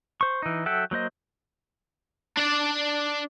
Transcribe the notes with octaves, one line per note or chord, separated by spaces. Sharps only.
C5 C#6
E3 D#4
F#3 A4 E5 F#5 G5
F#3 A#3 C5 D#5
D4 D5